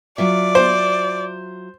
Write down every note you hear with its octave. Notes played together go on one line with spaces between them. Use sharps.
F#3 F4 D5 E5
C5